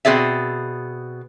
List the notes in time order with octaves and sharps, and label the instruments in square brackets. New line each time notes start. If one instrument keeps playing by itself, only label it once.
[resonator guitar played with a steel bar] B2 C4 G#4 D5 E5